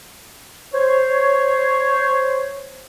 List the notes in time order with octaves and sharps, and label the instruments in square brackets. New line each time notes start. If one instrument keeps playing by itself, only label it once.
[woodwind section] C5 C#5